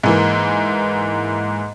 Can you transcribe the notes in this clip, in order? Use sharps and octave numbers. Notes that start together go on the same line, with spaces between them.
G#2 E3 A#3